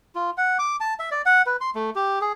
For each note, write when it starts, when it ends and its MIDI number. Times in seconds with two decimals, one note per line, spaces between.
0.15 0.31 65
0.37 0.58 78
0.59 0.76 86
0.80 0.94 81
0.99 1.10 76
1.11 1.22 74
1.26 1.42 78
1.46 1.57 71
1.61 1.70 84
1.75 1.90 57
1.95 2.19 67
2.21 2.32 68